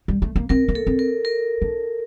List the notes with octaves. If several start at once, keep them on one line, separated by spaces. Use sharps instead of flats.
G3
A3
A#3
C4 A#4
A#3
A4
C4
A#4
A#4
D4